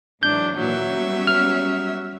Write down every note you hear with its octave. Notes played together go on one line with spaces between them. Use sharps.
G#2 E3 F#3 D4 G6
D#2 A#2 E3 F#3 E5
G3 B3 C#4
F6